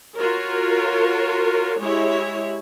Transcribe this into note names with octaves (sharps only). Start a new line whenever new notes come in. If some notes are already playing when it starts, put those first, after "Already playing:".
F4 F#4 A#4 C#5
G#3 E4 G4 C#5